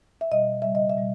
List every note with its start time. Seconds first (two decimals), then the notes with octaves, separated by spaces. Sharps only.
0.21 E5
0.32 B2 G3 D#5
0.62 C#3 G3 E5
0.75 D#5
0.90 E5
0.97 B2 G3